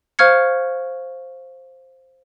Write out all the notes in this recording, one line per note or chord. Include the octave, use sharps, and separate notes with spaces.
C5 F5 C#6 F6 G#6 C#7